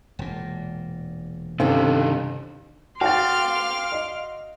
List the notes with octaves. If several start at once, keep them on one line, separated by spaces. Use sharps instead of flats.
E1 A#2
C2 G2 C3 D#3 C#4 D4 A4 F5
F#4 F5 G5 C6 D6 F6 A6
D#5